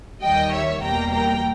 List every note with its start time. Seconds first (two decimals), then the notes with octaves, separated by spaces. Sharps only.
0.23 D#2 D#3 G3 D#5 G5
0.53 C#5 E5
0.83 E2 B2 G3 A#3 G5 A#5
1.12 G5 A#5